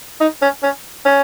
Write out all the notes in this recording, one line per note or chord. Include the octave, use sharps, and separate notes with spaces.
D#4
C#4
C#4
C#4